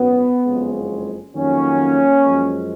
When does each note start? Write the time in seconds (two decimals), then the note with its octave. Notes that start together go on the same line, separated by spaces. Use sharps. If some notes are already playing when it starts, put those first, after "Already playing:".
Already playing: G#1 F#2 D#3 F#3 B3
0.46 F#1 F2 C#3 G#3
1.35 F2 D#3 F#3 A#3 C#4
2.24 F#2 F3 G#3